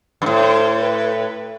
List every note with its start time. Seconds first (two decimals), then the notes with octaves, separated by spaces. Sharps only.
0.22 G2
0.26 A2 C5
0.81 B4